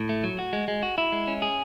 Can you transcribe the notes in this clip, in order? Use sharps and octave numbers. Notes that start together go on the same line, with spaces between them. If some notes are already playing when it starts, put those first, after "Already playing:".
Already playing: A2
A3
F#3
F#4
G#3
G#3
F#4
E4
G#3
C#4
G#4